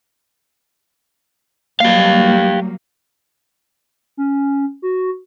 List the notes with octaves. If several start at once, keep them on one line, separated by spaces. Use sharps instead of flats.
F#3 G3 A#3 G4 F5
C#4
F#4